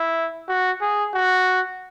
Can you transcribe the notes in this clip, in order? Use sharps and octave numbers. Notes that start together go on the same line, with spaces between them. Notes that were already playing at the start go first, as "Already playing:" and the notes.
Already playing: E4
F#4
G#4
F#4